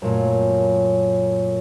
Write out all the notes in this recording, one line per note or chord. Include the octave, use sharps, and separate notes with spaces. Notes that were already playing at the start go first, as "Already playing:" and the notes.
F#2 A#2 A3